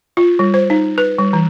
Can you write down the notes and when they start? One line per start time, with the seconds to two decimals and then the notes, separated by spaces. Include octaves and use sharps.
0.17 F4
0.39 G3
0.54 C5
0.70 D#4
0.98 B4
1.19 G3
1.33 E3